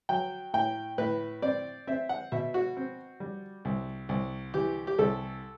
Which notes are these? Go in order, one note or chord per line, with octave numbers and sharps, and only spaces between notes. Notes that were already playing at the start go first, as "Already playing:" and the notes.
F#3 G5
A2 G5
A2 B4
C4 D5
C4 E5
F#5
B2 E5
F#4
C4
G3
C2
C2
E3 G4
G4
C2 A4